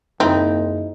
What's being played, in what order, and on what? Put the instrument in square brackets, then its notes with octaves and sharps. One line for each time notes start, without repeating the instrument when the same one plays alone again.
[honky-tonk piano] F#1 [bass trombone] D#2 [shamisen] C4 [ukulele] D#4 E4 A#5